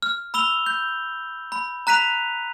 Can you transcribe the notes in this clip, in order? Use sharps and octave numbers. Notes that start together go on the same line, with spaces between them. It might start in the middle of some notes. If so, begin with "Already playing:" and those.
F6
B5 E6 F7 G7
G6
B5
A#5 F#6 B6 D#7 F7